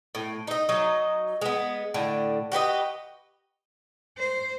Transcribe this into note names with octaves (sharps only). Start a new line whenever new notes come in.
A2
D#4 D#5
F#3 D#4 D#5
G#3 B3
A2 D3
F#4 G4 B4 D#5
C5